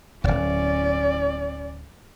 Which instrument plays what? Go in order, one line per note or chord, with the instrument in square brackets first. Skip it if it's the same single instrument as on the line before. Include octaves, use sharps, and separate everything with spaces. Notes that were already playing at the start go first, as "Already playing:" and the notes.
[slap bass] D1 G1 [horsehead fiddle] C#4 D5